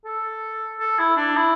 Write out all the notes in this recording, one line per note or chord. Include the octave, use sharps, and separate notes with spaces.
A4
A4
E4
D4
E4